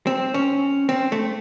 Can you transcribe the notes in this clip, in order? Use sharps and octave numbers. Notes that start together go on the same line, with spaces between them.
C4
C#4
C4
A3